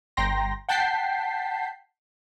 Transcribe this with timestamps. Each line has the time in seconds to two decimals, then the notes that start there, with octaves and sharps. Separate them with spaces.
0.17 G1 G5 A#5 C6 A#6
0.69 F#5 G5 A5 G6 B6 C7